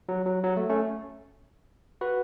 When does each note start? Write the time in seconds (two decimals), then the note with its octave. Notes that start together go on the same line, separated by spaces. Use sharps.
0.09 F#3
0.26 F#3
0.44 F#3
0.57 A3
0.69 A3 C#4
2.01 F#4 B4